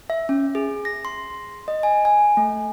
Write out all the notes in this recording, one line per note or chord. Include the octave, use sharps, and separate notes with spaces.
E5
C#4
G#4
A#6
C6
D#5
G#5
G#5
A3